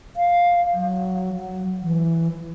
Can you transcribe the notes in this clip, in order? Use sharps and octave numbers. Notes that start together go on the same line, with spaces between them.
F5
F#3
F#3
E3